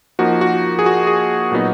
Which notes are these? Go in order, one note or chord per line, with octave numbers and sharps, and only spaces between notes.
F3 A#3 D#4 F#4
F#4
G#4
F#4
G#4
A#2 F#3 B3 D#4